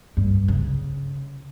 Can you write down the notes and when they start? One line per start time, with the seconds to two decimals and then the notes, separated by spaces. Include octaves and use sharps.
0.17 G2
0.48 C#3